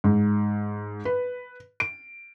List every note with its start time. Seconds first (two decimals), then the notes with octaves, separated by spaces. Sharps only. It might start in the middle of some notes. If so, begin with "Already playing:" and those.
0.04 G#2
1.05 B4
1.80 D7